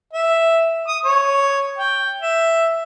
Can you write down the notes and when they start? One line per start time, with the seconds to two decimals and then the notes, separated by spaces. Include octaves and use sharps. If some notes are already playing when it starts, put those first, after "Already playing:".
0.13 E5
0.88 D#6
1.05 C#5
1.78 G5
2.22 E5